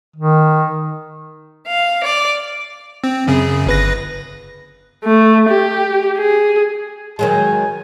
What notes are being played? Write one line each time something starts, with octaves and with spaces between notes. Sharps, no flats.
D#3
F5
D5
C4
F#2 C#3 G#4
G1 B4 A#6
A3
G4
G#4
D#3 F#3 G#3 G#5